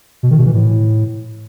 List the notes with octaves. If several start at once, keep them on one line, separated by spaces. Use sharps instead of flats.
B2
D#3
B2
E3
A2